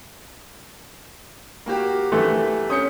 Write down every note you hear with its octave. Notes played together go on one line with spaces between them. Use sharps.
A#3 F#4 G4
E3 A3
C#4 D#6 G6 C#7